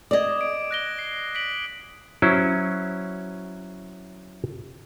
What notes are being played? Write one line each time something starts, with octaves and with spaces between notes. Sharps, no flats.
D5 D#5 D6 D#6 G#6
D6 D7
F#6 A#6 G7
C7
B6 D7 F#7
F#3 C#4 E4 C5